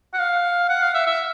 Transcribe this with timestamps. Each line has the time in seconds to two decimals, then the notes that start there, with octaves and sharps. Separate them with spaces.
0.14 F#5
0.19 F5
0.69 F#5
0.82 F5
0.94 E5
1.07 E5